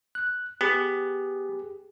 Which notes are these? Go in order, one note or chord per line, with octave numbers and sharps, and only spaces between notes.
F#6
B3 G4 G#4